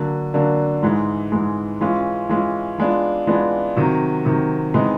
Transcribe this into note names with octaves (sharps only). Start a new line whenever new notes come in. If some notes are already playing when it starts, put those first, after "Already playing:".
Already playing: D3 F#3 A#3 D4
D3 F#3 A#3 D4
G#2 E3 G#3
G#2 E3 G#3
E3 G#3 C#4 F4
E3 G#3 C#4 F4
E3 G#3 B3 D4 F4
E3 G#3 B3 D4 F4
C3 D#3 F#3
C3 D#3 F#3
C3 E3 G#3 B3 D#4